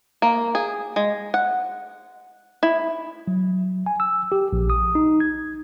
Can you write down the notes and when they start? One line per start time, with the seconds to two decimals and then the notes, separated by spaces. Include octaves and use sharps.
0.22 A#3
0.55 G#4
0.96 G#3
1.34 F#5
2.63 E4
3.27 F#3
3.86 G#5
4.00 E6
4.32 G4
4.53 A#1
4.70 D#6
4.95 D#4
5.20 G#6